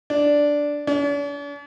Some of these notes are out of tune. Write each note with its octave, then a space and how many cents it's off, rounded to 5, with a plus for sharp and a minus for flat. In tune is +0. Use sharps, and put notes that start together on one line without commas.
D4 -5
D4 -45